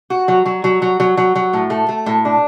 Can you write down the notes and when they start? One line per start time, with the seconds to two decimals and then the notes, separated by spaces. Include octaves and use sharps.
0.10 F#4
0.28 F#3
0.46 F#3
0.64 F#3
0.82 F#3
1.00 F#3
1.17 F#3
1.35 F#3
1.53 A2
1.70 A3
1.89 A3
2.06 A2
2.25 D4